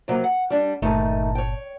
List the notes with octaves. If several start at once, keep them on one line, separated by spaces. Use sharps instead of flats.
C3 F#3 A#3
F#5
G3 D4
G1 A#2 D#3 A3 D#4 A5
C#5 G5